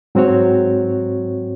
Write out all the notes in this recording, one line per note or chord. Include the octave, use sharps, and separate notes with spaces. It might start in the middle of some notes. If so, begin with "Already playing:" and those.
G#2 F#3 C4 F#4 C#5